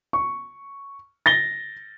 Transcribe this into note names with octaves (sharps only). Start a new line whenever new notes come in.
C#6
A6 A#6 G7